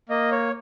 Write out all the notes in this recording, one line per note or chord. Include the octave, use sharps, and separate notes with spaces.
A#3 D#5
C#5